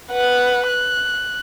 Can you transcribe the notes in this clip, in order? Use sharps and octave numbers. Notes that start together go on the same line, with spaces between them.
B4 F#5
F#6